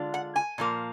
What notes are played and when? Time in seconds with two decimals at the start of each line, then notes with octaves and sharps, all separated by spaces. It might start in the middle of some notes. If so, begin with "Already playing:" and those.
Already playing: D3 G#3 D4 F4
0.14 F#5
0.36 G#5
0.58 A#2 F3 A#3